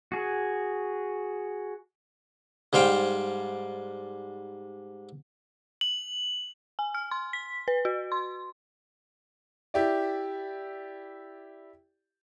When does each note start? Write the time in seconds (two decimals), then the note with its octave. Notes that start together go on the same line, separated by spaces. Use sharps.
0.12 F#4 G#4
2.73 G#2 G3 C5 F5 G5
5.81 F#7
6.79 G#5
6.94 F6
7.11 C6
7.33 B6
7.68 B4
7.85 F#4
8.12 C6
9.74 E4 G4 D5